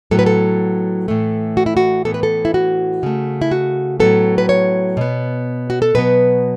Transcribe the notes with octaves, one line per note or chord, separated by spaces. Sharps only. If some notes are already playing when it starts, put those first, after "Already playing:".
A2 F#3 B3 A4
B4
A4
A2 E3 A3
F#4
E4
F#4
A2 E3 B3 A4
B4
A4
E4
F#4
C#3 A3
E4
F#4
A2 F#3 B3 A4
B4
C#5
B2 B3
F#4
A4
B2 F#3 B3 B4